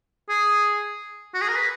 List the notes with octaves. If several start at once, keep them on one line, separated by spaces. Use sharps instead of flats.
G#4
F#4
G#4
A#4
B4